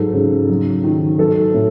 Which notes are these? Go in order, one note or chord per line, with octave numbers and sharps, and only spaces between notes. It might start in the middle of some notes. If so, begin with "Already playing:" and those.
Already playing: G#2 F#3 A4
C#3
F#3
D#3
F#3 A4
A2